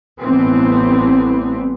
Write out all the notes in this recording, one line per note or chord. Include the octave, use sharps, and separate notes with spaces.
A1 A2 E3 G3 B3 C4